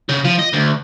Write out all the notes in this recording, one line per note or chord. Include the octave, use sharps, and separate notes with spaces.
C#3
F3
D#5
D2